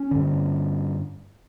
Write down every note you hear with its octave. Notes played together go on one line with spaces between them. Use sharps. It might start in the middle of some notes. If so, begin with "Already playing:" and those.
Already playing: C#4
G2 D3